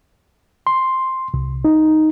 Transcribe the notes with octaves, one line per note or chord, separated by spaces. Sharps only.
C6
C2
D#4